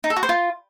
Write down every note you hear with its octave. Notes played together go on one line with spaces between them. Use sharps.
D#4
A4
F#4
C5
F4